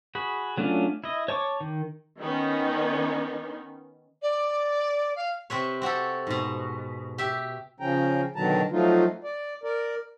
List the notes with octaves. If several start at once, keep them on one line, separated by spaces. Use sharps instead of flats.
F#4 G#4 B5
F#3 A3 C#4 D4 F4
E4 D#5
C#5 A5 C#6 D6
D#3
D#3 B3 C#4 D#4
D5
F5
C3 C4 B4 C#5
C4 F#4 G4 A4
G#2 B2
G4 E5
C#3 F3 C#4 G5 A#5
B2 D3 D#3 F#3 A5 A#5
F3 F#3 A3 D#4 F4
D5
A#4 D5